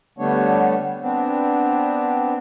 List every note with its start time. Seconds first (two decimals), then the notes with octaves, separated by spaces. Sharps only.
0.18 D3 G3 A3 B3 D4 C#5
1.01 B3 C4 D4